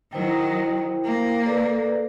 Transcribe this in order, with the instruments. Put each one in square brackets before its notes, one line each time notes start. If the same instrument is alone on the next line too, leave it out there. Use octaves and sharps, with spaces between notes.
[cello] D#3 F#3 [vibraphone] E4 C5 G5
[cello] A#3
[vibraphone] A4 B4 D5